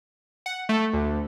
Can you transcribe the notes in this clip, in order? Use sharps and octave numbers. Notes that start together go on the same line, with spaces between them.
F#5
A3
D2